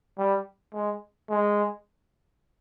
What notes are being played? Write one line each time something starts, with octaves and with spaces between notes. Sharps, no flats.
G3
G#3
G#3